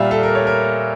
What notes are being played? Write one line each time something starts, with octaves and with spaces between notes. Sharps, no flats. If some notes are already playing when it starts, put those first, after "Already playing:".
Already playing: A#2 G3 E5 F5
A4
A#4
C#5
A#4